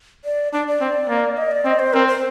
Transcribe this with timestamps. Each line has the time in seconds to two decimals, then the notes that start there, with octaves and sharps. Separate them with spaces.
0.25 D5
0.53 D4 D5
0.67 D5
0.80 C4
1.09 A#3
1.37 D#5
1.51 D5
1.65 C4 D#5
1.79 C5
1.93 C4 A#4
2.07 C5